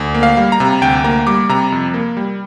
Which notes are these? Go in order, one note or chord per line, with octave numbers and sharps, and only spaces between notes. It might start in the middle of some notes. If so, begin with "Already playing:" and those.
Already playing: D2
A#3
F5
G3
A#5
C3
D2 G5
A#3 A#5
G3 D6
C3 A#5
F2
A#3
G3